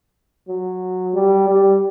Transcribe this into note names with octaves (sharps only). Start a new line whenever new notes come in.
F#3
G3
G3